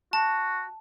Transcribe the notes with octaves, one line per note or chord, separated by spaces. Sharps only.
F#4 A5